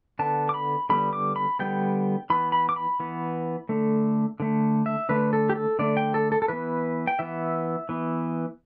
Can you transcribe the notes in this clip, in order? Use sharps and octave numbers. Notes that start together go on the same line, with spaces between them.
D3 B3 A5
D6
B5
D3 G3 B3 B5
D6
B5
D3 G3 B3 G5
E3 B3 B5
B5
D6
B5
E3 B3
D3 A3
D3 A3
E5
D3 A3 B4
A4
G4
A4
D3 A3 D5
G5
A4
A4
A4
E3 B3 B4
G5
E3 B3 E5
E3 B3